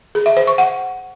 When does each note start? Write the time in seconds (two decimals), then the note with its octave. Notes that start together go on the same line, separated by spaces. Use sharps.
0.15 G#4
0.26 E5
0.37 C5
0.47 C#6
0.58 F#5